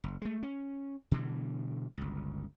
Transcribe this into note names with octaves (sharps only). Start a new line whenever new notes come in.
F#1
G#3 A3
C#4
B2 D3 E3 G3
G1 C#2